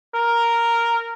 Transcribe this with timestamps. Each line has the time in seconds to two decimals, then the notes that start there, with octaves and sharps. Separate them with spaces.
0.15 A#4